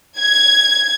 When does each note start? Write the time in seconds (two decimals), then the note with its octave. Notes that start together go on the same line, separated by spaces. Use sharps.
0.19 G#6